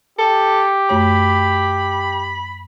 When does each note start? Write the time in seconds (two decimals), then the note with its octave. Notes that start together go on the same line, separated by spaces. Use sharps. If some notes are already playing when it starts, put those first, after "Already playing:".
0.19 G4 A4
0.90 F#2 A3 C#5 B5